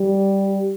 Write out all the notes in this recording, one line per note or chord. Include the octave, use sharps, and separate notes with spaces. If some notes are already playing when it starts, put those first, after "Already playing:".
Already playing: G3